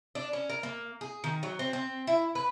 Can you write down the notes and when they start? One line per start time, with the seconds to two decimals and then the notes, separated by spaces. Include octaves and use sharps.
0.15 D4
0.33 C#4
0.49 A#4
0.63 A#3
1.01 G#4
1.24 D#3
1.43 F#3
1.59 C4
1.73 C4
2.07 E4
2.35 B4